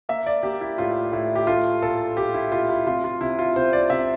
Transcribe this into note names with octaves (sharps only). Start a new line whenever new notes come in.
A#3 E5
D5
A#3 G4
E4
A2 F4
A2 E4
G4
A3 F4
A#2 A4
A#2 G4
E4
A#2 F4
E4
C3 F4
F4
C3 E4
F4
C3 C5
D5
C3 E5